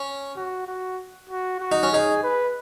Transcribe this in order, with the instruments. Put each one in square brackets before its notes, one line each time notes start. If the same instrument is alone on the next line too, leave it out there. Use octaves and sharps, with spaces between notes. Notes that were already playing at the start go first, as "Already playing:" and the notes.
Already playing: [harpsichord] C#4
[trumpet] F#4
F#4
F#4
F#4
[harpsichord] D#4
C#4
[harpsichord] D#4 [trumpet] G#4
[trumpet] B4